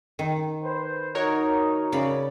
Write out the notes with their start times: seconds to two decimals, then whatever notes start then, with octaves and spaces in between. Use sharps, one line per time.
0.19 D#3
0.63 B4 C5
1.15 D#4 F#4 A#4 C#5
1.92 C#3 D5 B5